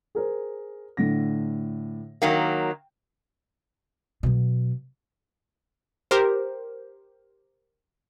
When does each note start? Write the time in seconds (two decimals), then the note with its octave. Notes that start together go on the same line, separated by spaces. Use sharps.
0.15 G#4 A#4 C5
0.97 A2 D3 A#6
2.22 D#3 F#3 A#3 G5
4.23 B2 F#3
6.11 G4 A#4 C5